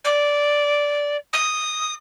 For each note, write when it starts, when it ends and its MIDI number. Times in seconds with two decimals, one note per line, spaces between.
0.04 1.17 74
1.33 1.94 87